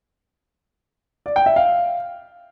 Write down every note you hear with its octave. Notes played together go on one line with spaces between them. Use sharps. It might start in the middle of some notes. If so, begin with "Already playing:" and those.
D5
G5
E5
F5